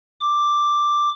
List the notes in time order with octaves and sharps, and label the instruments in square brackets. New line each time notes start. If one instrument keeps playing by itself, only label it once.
[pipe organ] D6